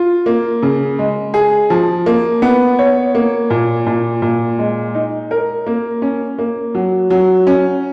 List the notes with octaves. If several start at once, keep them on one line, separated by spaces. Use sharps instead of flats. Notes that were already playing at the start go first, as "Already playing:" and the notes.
Already playing: F4
A#3
C#3
G#3
G#4
F3
A#3
B3
C#5
A#3
A#2
A#2
A#2
G#3
D#4
A#4
A#3
C#4
A#3
F#3
F#3
C#4